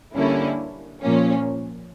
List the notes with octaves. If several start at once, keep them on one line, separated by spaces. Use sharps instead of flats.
D3 G3 A#3 C#4 E4
A#2 F3 A#3 C#4